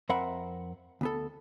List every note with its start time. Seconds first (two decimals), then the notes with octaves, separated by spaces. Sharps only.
0.09 F2 C4 A#4 E5 F#5 B5
1.01 D2 B3 A4